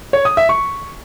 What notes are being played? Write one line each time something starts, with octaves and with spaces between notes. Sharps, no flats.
C#5
D#6
E5
C#6